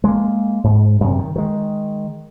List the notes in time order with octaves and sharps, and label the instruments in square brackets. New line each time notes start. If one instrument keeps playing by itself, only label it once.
[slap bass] G#3 A#3
G#2
F#2 C3
D#3
D#3 G#3